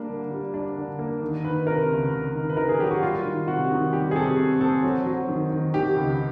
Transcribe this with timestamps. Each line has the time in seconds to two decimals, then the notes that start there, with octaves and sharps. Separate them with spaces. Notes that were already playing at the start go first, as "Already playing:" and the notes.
Already playing: G3 A#3 D4
0.09 D3
0.31 G3
0.54 D4
0.77 D3
0.99 A#3
1.22 D#3
1.44 D#3 B4
1.67 C3 A#4
1.89 C#2
2.12 C#2
2.35 D#3
2.49 B4
2.57 D#3 A#4
2.69 G#4
2.80 F#3 G4
2.91 F#4
3.02 G3 F4
3.25 D#3
3.48 C3 F#4
3.71 D#3
3.93 G3 G4
4.11 G#4
4.15 C3 A4
4.38 C4
4.61 C4 A4
4.83 F#3
5.06 F#3
5.28 D#3
5.51 D#3
5.74 D#3 G4
5.96 C#2